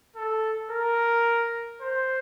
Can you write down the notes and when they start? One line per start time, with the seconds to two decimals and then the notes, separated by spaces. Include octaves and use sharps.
0.16 A4
0.72 A#4
1.81 C5